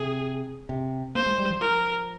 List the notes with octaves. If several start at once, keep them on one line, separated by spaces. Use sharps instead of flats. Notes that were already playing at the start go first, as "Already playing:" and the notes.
Already playing: C3 G#4
C3
A#3 C5
G#3
G3
F3
A#4